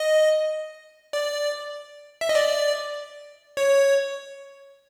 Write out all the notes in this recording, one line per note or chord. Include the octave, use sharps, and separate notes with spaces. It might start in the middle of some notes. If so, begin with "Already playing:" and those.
Already playing: D#5
D5
E5
D#5
D5
C#5